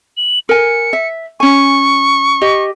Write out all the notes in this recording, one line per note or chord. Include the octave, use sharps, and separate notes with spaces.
F#7
A#4 G#5 C#7
E5
C#4 G#5 C#6
G4 D#5